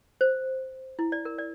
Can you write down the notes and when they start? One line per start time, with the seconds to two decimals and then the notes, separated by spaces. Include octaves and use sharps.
0.21 C5
0.99 E4
1.12 D5
1.25 A#4
1.38 D5